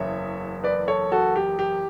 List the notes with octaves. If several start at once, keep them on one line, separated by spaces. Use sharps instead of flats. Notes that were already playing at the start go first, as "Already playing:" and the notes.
Already playing: F#1 E2 C#3 C#5 E5
B4 D5
A4 C#5
F#4 A4
G4
G4